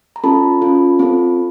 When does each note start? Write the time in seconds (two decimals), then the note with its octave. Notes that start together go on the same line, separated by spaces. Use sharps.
0.16 A#5
0.24 C#4 F4 A4 A5 B5
0.62 C#4 F4 A4
0.99 C4 F4 A4